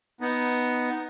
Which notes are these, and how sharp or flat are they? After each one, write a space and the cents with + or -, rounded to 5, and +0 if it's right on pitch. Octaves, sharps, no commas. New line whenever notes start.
B3 +0 D#4 +0